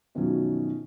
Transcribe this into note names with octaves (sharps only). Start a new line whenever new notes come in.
F#2 B2 D#3 F3 F#3 C#4